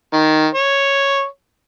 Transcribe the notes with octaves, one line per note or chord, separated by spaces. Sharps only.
D#3
C#5